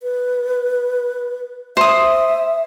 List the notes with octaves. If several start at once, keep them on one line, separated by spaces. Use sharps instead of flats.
B4
C5 E5 D#6